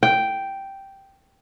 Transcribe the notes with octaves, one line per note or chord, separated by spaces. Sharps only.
G5